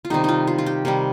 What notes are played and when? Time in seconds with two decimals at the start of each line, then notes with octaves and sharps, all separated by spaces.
0.05 F4
0.10 C3 D#3 G3 D#4
0.24 D#4 F4
0.47 F4
0.58 F4
0.66 G4
0.85 C3 D#3 G3 A#4